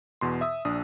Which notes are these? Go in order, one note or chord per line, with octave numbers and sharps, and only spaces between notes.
E2 B2 C6
E5 D#6 E6
A#1 D4 D#6